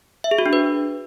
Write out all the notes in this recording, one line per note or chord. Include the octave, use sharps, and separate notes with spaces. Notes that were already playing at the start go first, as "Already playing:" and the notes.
E5
G#4
F#4
D4
B4